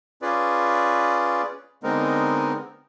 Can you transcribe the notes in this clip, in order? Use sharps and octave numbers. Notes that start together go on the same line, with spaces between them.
C#4 F4 G#4 B4 D5
D3 G#3 B3 C4 D#4 A#4